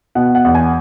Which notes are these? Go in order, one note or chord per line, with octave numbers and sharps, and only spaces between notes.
B2 F#5
F#5
E2
G#5